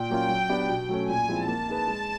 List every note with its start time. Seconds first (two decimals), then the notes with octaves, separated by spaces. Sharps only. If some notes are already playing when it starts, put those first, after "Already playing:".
Already playing: A#2 G5
0.10 F#3 A#3 C#4 F4
0.29 F#3
0.49 B3 D4 G4
0.69 B2
0.89 F#3 A3 C#4
1.08 A#2 G#5
1.29 F3 G#3 C4 E4
1.48 A#3 A5
1.67 D#4 G#4 B4
1.88 G#3